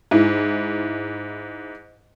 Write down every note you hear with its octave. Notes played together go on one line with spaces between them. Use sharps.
G#2 E4